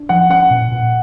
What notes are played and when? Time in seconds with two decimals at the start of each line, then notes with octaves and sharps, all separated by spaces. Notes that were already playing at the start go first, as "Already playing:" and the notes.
Already playing: D4
0.09 F3 F#5
0.30 C#4 F#5
0.50 A#2
0.72 A#2